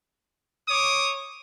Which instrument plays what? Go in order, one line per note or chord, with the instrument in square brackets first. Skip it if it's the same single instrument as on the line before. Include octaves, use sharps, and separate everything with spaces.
[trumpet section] C#5 D6 D#6